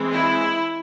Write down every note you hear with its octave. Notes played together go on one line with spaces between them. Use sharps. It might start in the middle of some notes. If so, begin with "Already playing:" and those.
Already playing: E3 G#3 C4
E4